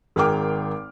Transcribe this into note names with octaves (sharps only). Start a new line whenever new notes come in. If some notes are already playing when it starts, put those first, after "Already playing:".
G#1 G#4 A#4 G5 D6 F6